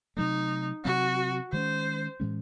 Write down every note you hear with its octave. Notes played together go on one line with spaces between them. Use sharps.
C3 F#3 A3 D#4
C3 F#3 C4 F#4
D#3 G#3 C#4 C5
A2 E3 G#3 C#4